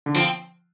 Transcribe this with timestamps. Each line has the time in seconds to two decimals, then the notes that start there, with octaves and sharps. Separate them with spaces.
0.06 D3
0.15 F3 C4